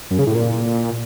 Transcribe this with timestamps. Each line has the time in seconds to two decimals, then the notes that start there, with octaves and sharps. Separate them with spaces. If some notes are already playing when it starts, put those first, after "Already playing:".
0.11 F#2
0.19 C#3
0.27 A2
0.35 A#2